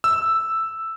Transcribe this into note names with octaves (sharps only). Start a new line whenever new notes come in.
E6